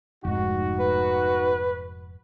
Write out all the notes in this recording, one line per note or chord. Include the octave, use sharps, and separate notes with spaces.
F1 G#2 D#4 F#4
B4